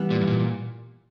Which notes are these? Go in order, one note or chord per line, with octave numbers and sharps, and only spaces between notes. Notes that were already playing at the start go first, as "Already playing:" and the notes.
Already playing: E3 G3 B3
A#2
G2
A#2